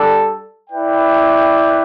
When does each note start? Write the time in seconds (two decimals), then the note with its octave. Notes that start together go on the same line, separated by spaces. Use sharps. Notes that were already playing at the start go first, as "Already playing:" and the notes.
Already playing: G3 D4 A4
0.70 E4 B4 D5 G5